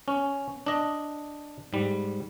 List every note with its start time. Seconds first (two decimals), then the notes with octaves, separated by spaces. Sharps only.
0.08 C#4
0.66 D4 D#5
1.73 G#2 G3